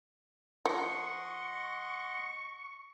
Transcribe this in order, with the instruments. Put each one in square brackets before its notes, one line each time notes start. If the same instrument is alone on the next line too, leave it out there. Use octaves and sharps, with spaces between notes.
[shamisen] F3 [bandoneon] D#5 F#5 C6 [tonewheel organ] C#6